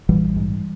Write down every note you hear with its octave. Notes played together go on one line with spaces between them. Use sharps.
A#1 E3 G3
G#2